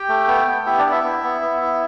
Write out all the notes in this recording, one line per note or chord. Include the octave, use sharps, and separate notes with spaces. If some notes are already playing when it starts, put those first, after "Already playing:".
Already playing: G4 G5
A3
B3
B3
E4 G4 E5
D4 D5
B3
E4 E5
B3
B3
B3
E4